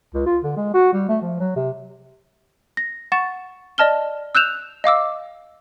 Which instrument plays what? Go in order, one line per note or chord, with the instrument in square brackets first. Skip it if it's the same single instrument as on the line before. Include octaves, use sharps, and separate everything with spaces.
[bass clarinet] C#2
F4
D3
G#3
F#4
G3
A3
F3
F#3
C3
[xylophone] A#6
F#5 C#6 A6 E7
D5 D#5 A5 F6 G7
E6 F#6 G6 E7 F7
D#5 F5 D6 E6